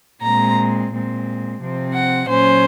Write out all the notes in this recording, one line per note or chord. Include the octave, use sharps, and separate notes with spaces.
A#2 G#3 C4 A#5
A#2 G#3 C4
C3 F3 C4
F#5
A#2 F#3 C#4 C5